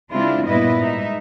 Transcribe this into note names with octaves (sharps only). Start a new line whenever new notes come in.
C#3 G#3 C4 D4 E4 F4
G2 A#2 B3 E4 B4 D#5
G#2 D#4 E5